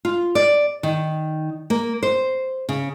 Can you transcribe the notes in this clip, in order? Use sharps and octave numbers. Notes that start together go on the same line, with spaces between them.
F4
D5
D#3
A#3
C5
C#3